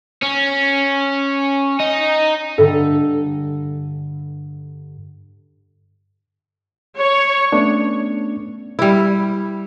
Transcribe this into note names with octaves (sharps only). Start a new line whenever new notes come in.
C#4
D#4
G2 D3 A4 E5
C#5
A3 B3 C#4 D4
G3 E4